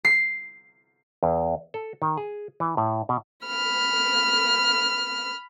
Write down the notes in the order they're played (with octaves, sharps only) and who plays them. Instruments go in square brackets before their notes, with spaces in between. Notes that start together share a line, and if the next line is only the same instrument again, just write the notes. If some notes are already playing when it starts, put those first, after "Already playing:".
[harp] C7
[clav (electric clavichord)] E2
A4
D#3
G#4
E3
A2
B2
[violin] B5 F6